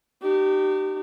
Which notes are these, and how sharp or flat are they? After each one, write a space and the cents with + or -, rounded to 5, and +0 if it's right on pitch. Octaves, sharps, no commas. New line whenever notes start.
D#4 -40 G4 -25